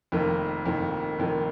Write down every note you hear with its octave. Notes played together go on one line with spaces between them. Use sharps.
F1 F2 D#3 A#3
F1 F2 D#3 A#3
F1 F2 D#3 A#3